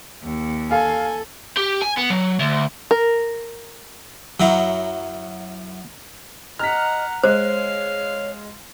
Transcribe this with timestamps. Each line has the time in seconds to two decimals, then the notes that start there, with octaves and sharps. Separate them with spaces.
0.23 D#2
0.71 A4 F5 G#5
1.57 G4
1.82 G#5
1.97 B3
2.10 F#3
2.40 D2
2.91 A#4
4.40 F#2 F#3 E4 A#5
6.59 D#5 F#5 A#5 F6 B6
7.24 G#3 C5 C#5 F5